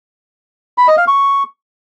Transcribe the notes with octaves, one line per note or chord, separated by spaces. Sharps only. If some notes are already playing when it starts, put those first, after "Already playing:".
B5
D#5
F5
C#6